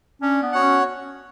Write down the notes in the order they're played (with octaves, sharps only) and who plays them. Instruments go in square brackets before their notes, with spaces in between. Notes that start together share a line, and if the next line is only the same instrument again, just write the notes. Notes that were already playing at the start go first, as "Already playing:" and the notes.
[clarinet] C#4 [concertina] D4
[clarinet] B3
[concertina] F#4 C#5 F#5
[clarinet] C#4